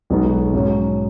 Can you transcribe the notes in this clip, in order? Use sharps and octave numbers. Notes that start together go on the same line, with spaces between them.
B1 B2 G#3 B3 D#4
G#2 F#3 C#4